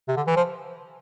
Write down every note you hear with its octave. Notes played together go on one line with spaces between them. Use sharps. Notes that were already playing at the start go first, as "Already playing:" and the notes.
C3
D3
E3
F3